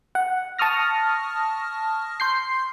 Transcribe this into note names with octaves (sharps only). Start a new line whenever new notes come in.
F#5
A5 C#6 D#6 F6 A#6
C6 G6 C7